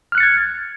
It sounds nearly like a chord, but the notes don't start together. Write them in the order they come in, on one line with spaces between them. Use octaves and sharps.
F6 F#6 C#7 A6 G#6